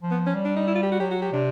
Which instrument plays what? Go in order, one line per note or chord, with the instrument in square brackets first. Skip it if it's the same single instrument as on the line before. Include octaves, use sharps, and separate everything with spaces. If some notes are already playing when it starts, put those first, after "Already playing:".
[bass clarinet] F3
[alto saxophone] B3
C#4
[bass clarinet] G3
[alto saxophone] D4
D#4
E4
F4
G4
F#4
[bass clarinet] F#3 [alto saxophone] G4
[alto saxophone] F#4
G4
[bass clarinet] C3 [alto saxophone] D4